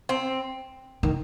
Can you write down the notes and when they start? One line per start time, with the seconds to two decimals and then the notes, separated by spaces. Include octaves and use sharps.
0.09 C4
1.03 D#3